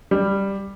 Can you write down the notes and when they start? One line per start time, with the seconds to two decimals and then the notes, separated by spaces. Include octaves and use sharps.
0.11 G3